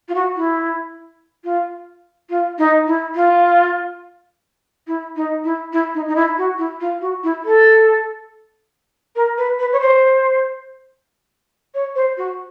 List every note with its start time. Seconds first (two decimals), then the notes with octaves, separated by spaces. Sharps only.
0.09 F4
0.15 F#4
0.36 E4
1.44 F4
2.30 F4
2.58 D#4
2.87 E4
3.15 F4
4.87 E4
5.16 D#4
5.44 E4
5.73 E4
5.95 D#4
6.08 D#4
6.16 E4
6.38 F#4
6.58 E4
6.80 F4
7.01 F#4
7.23 E4
7.45 A4
9.16 A#4
9.38 B4
9.59 B4
9.73 C#5
9.81 C5
11.74 C#5
11.95 C5
12.17 F#4